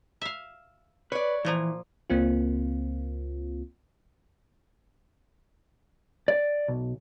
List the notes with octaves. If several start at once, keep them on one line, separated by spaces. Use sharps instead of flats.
E5 F5
B4 C#5 D5
A#2 E3 F3 A#3
C#2 A#3 C4 F4
D5
B1